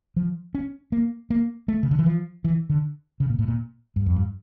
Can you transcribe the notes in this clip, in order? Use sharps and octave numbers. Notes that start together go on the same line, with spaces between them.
F3
C#4
A#3
A#3
A3
C#3
D3
E3
F3
E3
D3
C#3
A#2
A2
A#2
G2
F2
G2